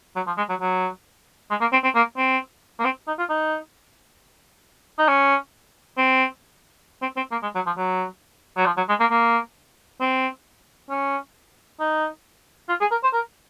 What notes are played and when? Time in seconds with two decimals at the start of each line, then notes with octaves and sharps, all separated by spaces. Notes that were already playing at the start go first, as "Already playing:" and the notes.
0.16 F#3
0.27 F3
0.38 G#3
0.49 F#3
0.61 F#3
1.50 G#3
1.61 A#3
1.73 C4
1.84 C4
1.95 A#3
2.17 C4
2.79 A#3
2.85 C4
3.07 D#4
3.19 F4
3.29 D#4
4.99 D#4
5.08 C#4
5.97 C4
7.02 C4
7.17 C4
7.32 A#3
7.43 G#3
7.55 F#3
7.66 F3
7.77 F#3
8.57 F#3
8.66 F3
8.77 F#3
8.89 G#3
9.00 A#3
9.11 A#3
10.01 C4
10.90 C#4
11.80 D#4
12.69 F4
12.81 G#4
12.91 A#4
13.03 C5
13.13 A#4